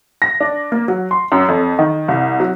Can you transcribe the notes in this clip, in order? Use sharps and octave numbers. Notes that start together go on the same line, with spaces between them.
A#6
D4
A#3
F#3
C6
F#2
F2
D#3
C2
F#3